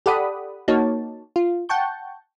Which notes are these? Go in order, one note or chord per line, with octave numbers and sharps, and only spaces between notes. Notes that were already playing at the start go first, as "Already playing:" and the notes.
G4 A4 D5 F#5 B5 D#6
A#3 D#4 F#4 C#5 A5
F4
F#5 G5 A5 C#6 G6